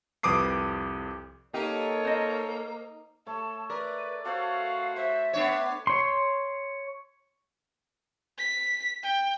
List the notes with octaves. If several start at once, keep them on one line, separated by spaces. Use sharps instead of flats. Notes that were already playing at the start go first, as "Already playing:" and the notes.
C2 F2 B4 D6 D#6 C7
A#3 D#4 G4 A4 A#4 C#5
C5 D#5
A3 C#5 A5
A#4 B4 D5
F#4 A4 C5 C#5 F5
C5 E5
B3 D4 C#5
C#5 C6
B6
G5